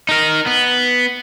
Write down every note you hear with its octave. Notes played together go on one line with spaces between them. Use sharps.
D#4 A#4
B3